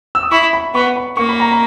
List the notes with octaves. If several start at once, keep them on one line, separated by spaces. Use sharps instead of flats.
E6
D#6
E4 C#6
B5
B3 C#6
B5
A#3 C#6
B5
A#5
B5